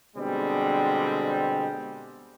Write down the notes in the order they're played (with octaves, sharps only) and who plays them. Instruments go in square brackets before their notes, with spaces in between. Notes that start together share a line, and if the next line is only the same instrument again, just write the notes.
[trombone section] B2 D3 G3 G#3 C4